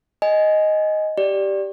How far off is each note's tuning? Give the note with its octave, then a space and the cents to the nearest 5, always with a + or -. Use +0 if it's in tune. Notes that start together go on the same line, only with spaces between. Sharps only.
D#5 +0 G#5 +0
G4 -5 D5 +0